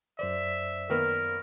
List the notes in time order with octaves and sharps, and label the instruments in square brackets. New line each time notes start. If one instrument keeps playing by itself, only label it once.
[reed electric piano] F#2 C5 D5 [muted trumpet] E5
[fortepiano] D#3 A#3 B3 [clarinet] A#4